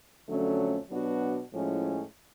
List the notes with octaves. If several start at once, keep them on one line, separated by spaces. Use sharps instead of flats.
F2 D3 F#3 A3 C#4
B2 F#3 B3 D4 F#4
A2 F3 G#3 C#4 E4